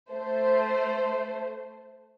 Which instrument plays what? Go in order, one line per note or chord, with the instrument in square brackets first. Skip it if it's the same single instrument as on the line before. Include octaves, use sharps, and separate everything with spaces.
[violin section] A3 C5